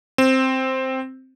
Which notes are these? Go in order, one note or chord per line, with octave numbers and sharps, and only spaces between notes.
C4